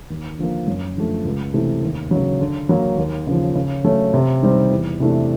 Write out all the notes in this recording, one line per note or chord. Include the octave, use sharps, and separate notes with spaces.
D#2
D3 F3 A#3
F#2
D3 F3 A3
C#2
C3 E3 A3
D#2
C#3 F#3
D3
F#3 A#3
D#2
C#3 F3
C#3
F#3 A3 C#4
C3
D#3 G3 C4 D#4
E2
C3 E3 A3 D4